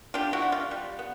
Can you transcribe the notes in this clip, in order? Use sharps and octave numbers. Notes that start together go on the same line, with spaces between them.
D4 F4 G4
E4 F#4
G3
F4
G3
B3